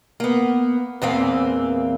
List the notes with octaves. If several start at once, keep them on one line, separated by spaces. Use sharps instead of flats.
A#3 B3
E2 A#2 E3 A#3 C4 F5